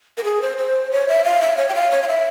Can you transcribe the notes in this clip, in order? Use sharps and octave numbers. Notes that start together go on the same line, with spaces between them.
A#4
G#4
C5
C5
C#5
E5
F5
E5
C#5
G5
F5
C#5
F5
E5